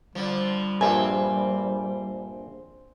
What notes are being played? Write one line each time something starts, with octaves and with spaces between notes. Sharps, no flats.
D3 F3 G3
A#1 G2 C4 G#5